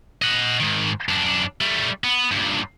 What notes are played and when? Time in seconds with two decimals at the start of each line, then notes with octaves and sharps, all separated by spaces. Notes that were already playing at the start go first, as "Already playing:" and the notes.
0.22 D#5 F#5
0.60 G#2 D#3
1.09 F#2 D4
1.61 G3 A3
2.04 B3
2.32 G2 A#2